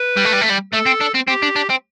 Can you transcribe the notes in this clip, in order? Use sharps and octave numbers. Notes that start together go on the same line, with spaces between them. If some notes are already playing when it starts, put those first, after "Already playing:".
Already playing: B4
G3
A3
G3
A3
G3
A3 A4
C4
D4
C4
C4 G4
D4
D4
C4